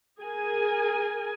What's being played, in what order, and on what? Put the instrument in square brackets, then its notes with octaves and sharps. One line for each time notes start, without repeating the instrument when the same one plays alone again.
[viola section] G#4 A#4 G#5